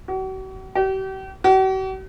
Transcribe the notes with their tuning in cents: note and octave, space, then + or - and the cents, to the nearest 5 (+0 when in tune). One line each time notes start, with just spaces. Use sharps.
F#4 +40
G4 -40
F#4 +45